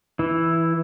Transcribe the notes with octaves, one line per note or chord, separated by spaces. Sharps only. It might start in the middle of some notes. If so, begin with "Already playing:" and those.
E3 E4